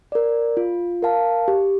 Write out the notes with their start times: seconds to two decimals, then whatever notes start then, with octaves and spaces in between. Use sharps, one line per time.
0.12 A#4 D5
0.57 F4
1.02 A#4 F5 A5
1.48 G4